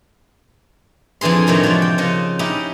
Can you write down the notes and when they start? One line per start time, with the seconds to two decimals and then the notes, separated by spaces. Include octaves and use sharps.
1.21 F2 D3 E3 G#4 C6
1.47 A2 C3 D#3 F#3
1.63 F3 G#3 F#4 D5
1.82 G5
1.98 C#3 F3 C5 D#5
2.39 C#4 D#4 E4 G4 G5